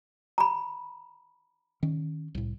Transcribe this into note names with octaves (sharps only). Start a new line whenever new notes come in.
A#5 B5
D#3 C#4
C2 A2